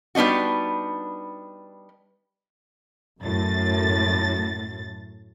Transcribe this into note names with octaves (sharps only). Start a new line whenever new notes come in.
G3 B3 D4 D#4 F#4
F#2 A2 A6